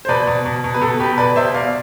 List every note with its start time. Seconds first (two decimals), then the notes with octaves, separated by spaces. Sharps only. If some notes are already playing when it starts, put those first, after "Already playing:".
0.05 C5
0.08 B2 B4 D5
0.27 B2
0.46 B2
0.64 B2
0.74 B4
0.82 B2 A4
0.99 B2 G4 B4
1.18 B2 B4 D5
1.36 B2 C5 E5
1.54 B2 D5 F5